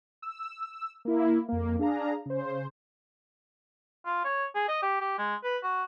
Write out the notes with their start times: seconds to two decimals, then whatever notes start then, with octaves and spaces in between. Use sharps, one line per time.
0.22 E6
1.05 A#3 E4
1.49 F2 A#3
1.79 D4 G#4 F5 A#5
2.26 C#3 C5
4.06 F4
4.25 C#5
4.55 G#4
4.68 D#5
4.83 G4
5.01 G4
5.18 G#3
5.44 B4
5.63 F#4